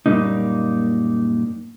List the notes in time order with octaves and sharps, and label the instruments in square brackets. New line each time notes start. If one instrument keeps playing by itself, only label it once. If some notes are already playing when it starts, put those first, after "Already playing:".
[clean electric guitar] F#2 A#2 C#3 G3 A#3 D#4